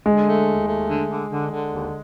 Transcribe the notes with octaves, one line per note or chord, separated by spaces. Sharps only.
D3 G#3
A3
D#2
A3
D3
D3
D3
D3
D#2